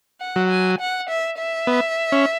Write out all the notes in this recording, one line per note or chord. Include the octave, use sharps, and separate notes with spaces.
F#5
F#3
G#5
F#5
E5
E5
B3
C#4